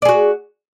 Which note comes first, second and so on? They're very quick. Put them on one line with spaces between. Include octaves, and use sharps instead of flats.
D5 G#4 F#4